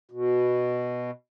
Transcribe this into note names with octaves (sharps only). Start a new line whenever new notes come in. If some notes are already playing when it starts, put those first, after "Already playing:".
B2